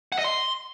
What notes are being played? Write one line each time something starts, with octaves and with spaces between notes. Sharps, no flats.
F#5
D#5
C6